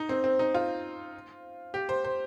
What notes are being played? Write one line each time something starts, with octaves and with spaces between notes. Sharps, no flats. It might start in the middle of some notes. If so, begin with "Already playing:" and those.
Already playing: D#4
C4
C4
D#4
F4
G4
C5
C5